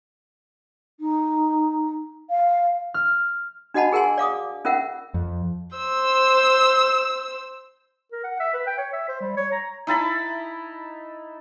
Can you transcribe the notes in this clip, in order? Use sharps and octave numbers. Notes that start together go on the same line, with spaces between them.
D#4
F5
F6
D4 F#4 D#5 F#5 A5 B5
G#4 A#4 F#5 G#5 C6
D5 F5 D6 D#6
C#4 F4 A#4 E5 F#5
F2
C5 E6
A#4
F#5
E5
B4
G5
C#5
E5
C5
G3
C#5
A#5
D#4 E4 A5 B5